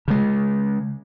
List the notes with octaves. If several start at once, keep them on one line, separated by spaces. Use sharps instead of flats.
C#3 G#3